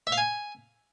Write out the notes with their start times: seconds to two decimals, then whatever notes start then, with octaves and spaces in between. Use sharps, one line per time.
0.07 E5
0.12 F5
0.18 G#5